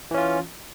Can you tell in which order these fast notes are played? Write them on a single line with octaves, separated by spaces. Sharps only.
E3 C#4 F4